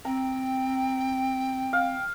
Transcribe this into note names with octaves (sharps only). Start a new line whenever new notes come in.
C4 G5 A#5
F5